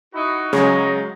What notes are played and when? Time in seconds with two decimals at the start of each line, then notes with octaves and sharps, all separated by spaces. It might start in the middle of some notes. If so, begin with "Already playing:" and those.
0.14 D#4 E4 F#4
0.53 C#3 F#3 G#3 C#5 D#5 A#5